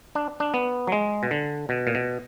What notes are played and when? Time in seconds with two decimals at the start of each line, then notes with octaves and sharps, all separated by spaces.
0.15 D4
0.40 D4
0.54 B3
0.87 F#3
0.92 G#3
1.23 B2
1.31 D3
1.69 B2
1.87 A#2
1.95 B2